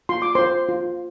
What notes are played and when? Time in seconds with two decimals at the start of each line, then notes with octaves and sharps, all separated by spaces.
0.09 F4 C6
0.22 D6
0.35 F4 C5 C6
0.69 F4